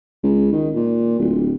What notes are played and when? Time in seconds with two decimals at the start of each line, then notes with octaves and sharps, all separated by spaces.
0.23 C#2
0.52 D#3
0.75 A#2
1.19 D1